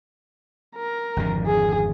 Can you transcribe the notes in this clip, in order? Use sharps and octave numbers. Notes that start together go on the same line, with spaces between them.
A#4
G#1 F2 D3
G#4